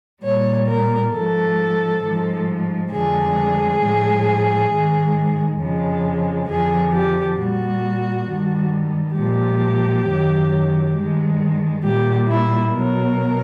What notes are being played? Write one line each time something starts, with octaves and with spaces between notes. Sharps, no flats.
A#2 G3 C#5
A#4
G#2 F3 G#3 A4
G#2 F3 G#3
F2 D3 F3 G#3 G#4
A2 F3 G#3
G#2 D#3 G#3
F2 C#3 F3 G#3
F2 D3 F3 G#4
G4
A#2 G3 F#4
G2 D#3 G3
A#2 F3 G#3 G4
F#2 D#3 F#3
G2 D#3 G#3
A#2 G3 G4
E4
B2 F#3 A#4